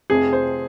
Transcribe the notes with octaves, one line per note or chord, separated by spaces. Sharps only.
F1 F2 C3 G#4
C5